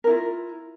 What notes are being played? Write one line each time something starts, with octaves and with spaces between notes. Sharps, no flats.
E4 F4 A#4